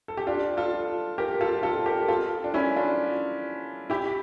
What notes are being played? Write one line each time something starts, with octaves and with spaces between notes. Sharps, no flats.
A4
G4
D4 F4
F4 A4
G4 A#4
F4 A4
F4 A4
G4 A#4
F4 A4
D4
C#4 E4
D4 F4
E4 G4